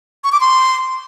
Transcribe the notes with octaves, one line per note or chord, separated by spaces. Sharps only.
C#6
D6
C6